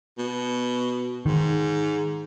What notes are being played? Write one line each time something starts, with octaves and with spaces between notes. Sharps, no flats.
B2
G#2 D#3